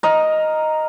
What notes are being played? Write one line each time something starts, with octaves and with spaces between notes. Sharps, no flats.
A#4 D#5